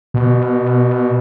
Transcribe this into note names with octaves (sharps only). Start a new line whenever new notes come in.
B2